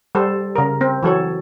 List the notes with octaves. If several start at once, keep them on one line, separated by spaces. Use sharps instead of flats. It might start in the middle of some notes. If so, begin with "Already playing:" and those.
G3 A4 C5
C#3 A#4
C4
E3 F#3 A4 C#5